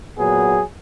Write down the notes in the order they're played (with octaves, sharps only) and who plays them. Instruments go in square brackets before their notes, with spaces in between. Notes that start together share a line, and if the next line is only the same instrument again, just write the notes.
[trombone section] A#2 F#3 B3 G#4